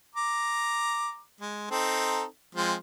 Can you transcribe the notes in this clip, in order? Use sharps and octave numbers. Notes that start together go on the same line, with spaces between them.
A#5 D6
G#3
C4 D#4 A4
F3 G#3 C4